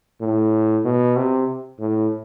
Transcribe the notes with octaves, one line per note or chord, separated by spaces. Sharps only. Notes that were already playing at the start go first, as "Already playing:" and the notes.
A2
B2
C3
A2